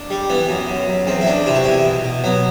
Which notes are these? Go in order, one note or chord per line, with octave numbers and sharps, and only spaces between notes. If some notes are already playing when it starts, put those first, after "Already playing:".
Already playing: D4
G3
E3 B3
F#2
F#2
F#2
E2 C4
E4
E2 D4
C3 E4
F#4
E2 E4
B2
B2
F#3 B3